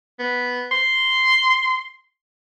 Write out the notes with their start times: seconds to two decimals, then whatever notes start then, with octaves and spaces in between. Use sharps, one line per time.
0.19 B3
0.72 C6